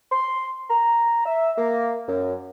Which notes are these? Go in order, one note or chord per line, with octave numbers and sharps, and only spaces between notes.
C6
A#5
E5
A#3
F#2